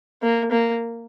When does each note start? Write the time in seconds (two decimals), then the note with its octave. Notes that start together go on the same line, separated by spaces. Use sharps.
0.22 A#3
0.51 A#3